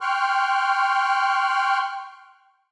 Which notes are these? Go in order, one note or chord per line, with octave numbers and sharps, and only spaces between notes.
G5 C6 C#6 F6 F#6